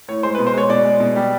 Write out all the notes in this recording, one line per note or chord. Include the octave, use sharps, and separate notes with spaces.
A2 C#5
G#3 C5
B4
B2
C5
G#3 C#5
B2 D5
G#3
B2
G3